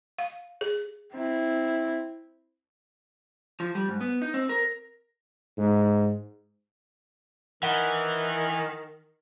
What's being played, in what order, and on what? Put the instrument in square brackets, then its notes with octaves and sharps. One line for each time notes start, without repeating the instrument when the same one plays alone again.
[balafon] F5
G#4
[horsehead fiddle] C4 E4
[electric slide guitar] F3
G3
G#2
B3
D#4
C4
A#4
[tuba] G#2
[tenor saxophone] D#3 [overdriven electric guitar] E3 [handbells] F#5